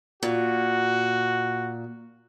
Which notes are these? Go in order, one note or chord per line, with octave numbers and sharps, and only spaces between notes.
A#2 F#4